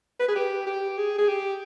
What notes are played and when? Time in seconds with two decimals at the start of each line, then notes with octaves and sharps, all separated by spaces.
0.20 B4
0.28 G#4
0.36 G4
0.67 G4
0.97 G#4
1.19 G#4
1.28 G4